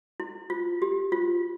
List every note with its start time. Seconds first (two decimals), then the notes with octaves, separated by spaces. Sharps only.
0.20 E4
0.50 F4
0.82 G4
1.12 F4